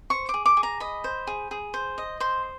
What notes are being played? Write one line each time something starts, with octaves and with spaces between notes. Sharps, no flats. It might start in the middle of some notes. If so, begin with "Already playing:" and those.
C5 C#6
D6
G#4
D6
G#4
A#5
D#5 B5
C5
G#4
G#4
C5
D#5
C5 C6